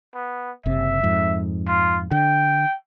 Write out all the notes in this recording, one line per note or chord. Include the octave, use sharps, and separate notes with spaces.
B3
F#1 C3 E5
F2 G#2
F4
D3 G5